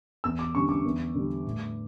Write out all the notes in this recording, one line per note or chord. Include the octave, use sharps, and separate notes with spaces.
E2 E6
D6
D3 G3 C#4 C#6
D6
E2
D3 G3 D4
A2